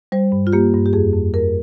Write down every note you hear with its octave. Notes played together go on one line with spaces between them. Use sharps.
G3 C5
G2
F4
A#3 G4
G2
G4
F2 G#4
F2
F2 A#4